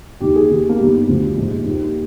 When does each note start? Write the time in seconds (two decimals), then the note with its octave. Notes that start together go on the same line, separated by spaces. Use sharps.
0.21 D#2 D#3 G4
0.36 G#4
0.50 D#2 D#3 G4
0.69 A#3
0.79 G1 G2 D#3 G3
1.08 D2 D3 F3
1.37 A#1 G#2 F3
1.66 D#2 D#3